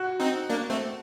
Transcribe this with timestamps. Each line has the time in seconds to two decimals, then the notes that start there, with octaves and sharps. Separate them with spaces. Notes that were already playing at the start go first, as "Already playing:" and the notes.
Already playing: F#4
0.20 C4 D#4
0.49 A#3 D4
0.70 A3 C4